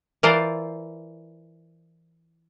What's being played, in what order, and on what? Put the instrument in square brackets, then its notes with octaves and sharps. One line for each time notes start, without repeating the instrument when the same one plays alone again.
[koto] E3 F4 A#4 C5 D5